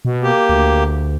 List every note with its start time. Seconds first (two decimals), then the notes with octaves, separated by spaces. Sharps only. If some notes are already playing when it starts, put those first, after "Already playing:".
0.05 B2
0.23 A#3 G4
0.49 D2